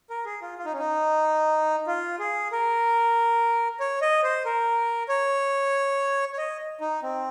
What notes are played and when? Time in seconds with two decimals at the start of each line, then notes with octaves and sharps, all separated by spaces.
0.10 A#4
0.25 G#4
0.42 F4
0.58 F4
0.65 D#4
0.73 C#4
0.79 D#4
1.87 F4
2.19 G#4
2.52 A#4
3.80 C#5
4.02 D#5
4.23 C5
4.45 A#4
5.09 C#5
6.33 C#5
6.38 D#5
6.81 D#4
7.03 C4